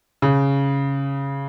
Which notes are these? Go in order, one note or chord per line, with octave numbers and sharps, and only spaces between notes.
C#3